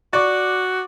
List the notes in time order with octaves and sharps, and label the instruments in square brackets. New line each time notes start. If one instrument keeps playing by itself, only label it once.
[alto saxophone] F#4 [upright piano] D5 C#6 D6